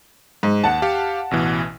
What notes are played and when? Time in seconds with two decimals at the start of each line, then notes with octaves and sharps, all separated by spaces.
0.43 G#2
0.64 D#2 F#5 A5
0.82 G4 F5
1.31 A1 B2 E3